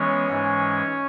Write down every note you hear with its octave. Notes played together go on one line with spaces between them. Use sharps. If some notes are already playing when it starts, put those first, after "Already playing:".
Already playing: E3 G#3 B3 C#4 C#5
G#2 E3 G#3